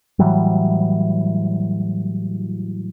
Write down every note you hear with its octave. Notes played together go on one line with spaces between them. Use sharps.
A2 E3 F#3 G3